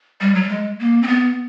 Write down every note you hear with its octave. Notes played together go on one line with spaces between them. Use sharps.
G3
F#3
G3
G#3
A#3
C4
B3